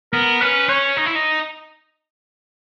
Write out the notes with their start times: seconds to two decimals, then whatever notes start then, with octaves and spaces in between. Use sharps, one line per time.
0.13 B3 A#4
0.41 C#4 B4
0.69 C#4 C#5
0.97 D#4
1.06 E4
1.15 D#4